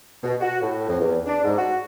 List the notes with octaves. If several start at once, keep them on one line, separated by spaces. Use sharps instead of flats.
B2
F#4
A2
F2
E2
D4
G#2
F#4